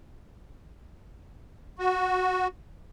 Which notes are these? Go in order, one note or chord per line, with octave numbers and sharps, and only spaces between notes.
F#4